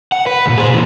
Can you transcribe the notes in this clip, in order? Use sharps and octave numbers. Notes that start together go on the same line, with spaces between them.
F#5
B4
C2 A#2
G#4 C5
A#2 E3